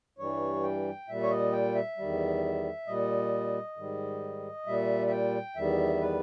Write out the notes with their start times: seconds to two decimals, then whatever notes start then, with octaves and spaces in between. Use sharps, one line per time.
0.18 G2 E3 G3 C#5
0.63 G5
1.08 A#2 G3 E5
1.22 C#5
1.30 D#5
1.53 G5
1.75 E5
1.97 E2 D#3 G3
2.87 A#2 G3 D#5
3.77 G#2 D#3 G3
4.66 A#2 G3 E5
5.07 E5
5.10 G5
5.56 E2 D#3 G3 E5
6.01 B4